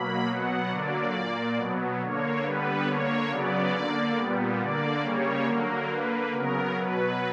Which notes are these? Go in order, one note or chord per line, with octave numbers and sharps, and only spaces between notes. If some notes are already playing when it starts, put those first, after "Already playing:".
Already playing: B2 F#3 A#3 B5
B2 F#3 B3 F#5
D3 F#3 A#3 D5
A#2 A#3
B2 F#3 B3
D3 A#3 C#5
D3 G3 B3 B4
D3 A#3 C#5
C#3 F#3 B3 D5
D3 A#3
A#2 G3 B3
D3 A#3 D5
C#3 G3 A#3 C#5
D3 F#3 A#3 A#4
D3 A#3 B4
C#3 F#3 B3 A#4
B2 F#3 B3 B4